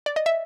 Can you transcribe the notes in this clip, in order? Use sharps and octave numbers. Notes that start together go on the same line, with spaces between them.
D5
D#5
E5